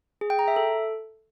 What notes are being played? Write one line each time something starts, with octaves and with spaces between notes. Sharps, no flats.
G#4
G5
A#5
E5
A4